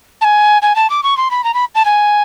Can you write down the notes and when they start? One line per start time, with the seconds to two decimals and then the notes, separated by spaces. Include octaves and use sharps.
0.21 A5
0.24 G#5
0.62 G#5
0.76 A5
0.90 D6
1.03 C#6
1.17 C6
1.31 B5
1.44 A#5
1.54 B5
1.75 A5
1.85 G#5